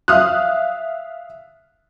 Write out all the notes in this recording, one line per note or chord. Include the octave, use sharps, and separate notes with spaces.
E5 F5 D#6 F6 F#6